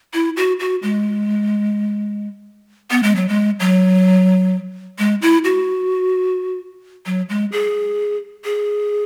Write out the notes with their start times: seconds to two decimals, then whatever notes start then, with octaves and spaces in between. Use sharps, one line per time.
0.14 E4
0.37 F#4
0.60 F#4
0.83 G#3
2.91 B3
3.03 G#3
3.16 F#3
3.28 G#3
3.60 F#3
4.99 G#3
5.22 E4
5.44 F#4
7.06 F#3
7.29 G#3
7.52 G#4
8.45 G#4